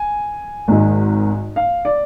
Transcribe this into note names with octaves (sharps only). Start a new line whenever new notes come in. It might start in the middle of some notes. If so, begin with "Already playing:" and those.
Already playing: G#5
G#1 G#2 G#3
F5
D5